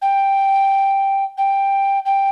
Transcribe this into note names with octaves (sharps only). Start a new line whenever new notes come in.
G5
G5
G5